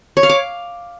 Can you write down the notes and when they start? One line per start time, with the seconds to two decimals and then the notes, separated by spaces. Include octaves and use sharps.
0.17 C#5
0.23 F5
0.30 D6